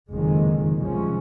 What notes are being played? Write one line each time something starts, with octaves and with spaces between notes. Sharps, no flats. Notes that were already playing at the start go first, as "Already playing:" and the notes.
F#1 F2 C3 D#3 G#3
C2 C3 F3 G#3 C#4